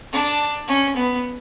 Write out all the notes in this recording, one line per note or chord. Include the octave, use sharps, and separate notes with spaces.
D4
C#4
B3